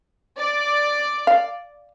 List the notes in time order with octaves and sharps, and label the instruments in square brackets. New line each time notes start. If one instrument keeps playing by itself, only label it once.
[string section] D5
[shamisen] F5